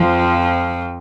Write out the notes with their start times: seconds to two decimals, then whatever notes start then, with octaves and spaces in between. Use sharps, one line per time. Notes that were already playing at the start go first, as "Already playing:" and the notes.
Already playing: F2 F3